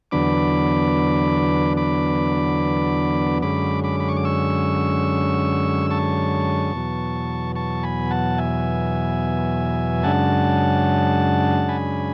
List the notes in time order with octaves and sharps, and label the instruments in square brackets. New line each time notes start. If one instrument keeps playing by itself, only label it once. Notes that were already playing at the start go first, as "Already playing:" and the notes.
[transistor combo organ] E2 D3 F#3 B3 D4 B5 D6
B5 D6
F#2 D3 G#3 C#4 B5 D6
B5 D6
B5
C#6
D6
C#6 E6
A5 C#6
E2 B2 F#3
A5 C#6
G#5 B5
F#5 A5
E5 G#5
F#2 C#3 G#3 D4 F#5 A5
G#5 B5